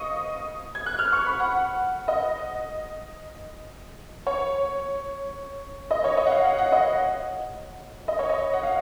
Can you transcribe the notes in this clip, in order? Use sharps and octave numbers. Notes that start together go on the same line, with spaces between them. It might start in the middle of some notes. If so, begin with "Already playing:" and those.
Already playing: D#5 F5 C#6 D#6
G#6
F#6
F6
C#6
B5
F#5
D#5
C#5
D#5
C#5
D#5
F#5
F5
F#5
F#5
D#5
D#5
C#5
D#5
F#5
F5